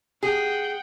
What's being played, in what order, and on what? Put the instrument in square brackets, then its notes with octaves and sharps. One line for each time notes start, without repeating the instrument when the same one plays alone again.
[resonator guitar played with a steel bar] G#4 [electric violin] F#5 G5